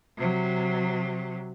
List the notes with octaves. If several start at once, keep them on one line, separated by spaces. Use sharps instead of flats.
C3 F#3